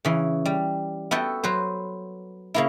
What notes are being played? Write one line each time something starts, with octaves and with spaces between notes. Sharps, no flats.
C#3 E3
G3
B3 F#4 A4 E5 G5
F#3 B4 C5
C#3 A#3 E4